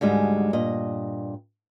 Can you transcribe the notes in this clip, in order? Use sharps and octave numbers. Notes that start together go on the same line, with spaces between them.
D2 G#2 G3 G#3
G2 A#2 D#5